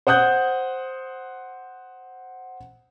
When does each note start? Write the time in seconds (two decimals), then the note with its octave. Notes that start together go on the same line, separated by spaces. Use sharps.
0.07 C5 F#5 D#6 F#6 G6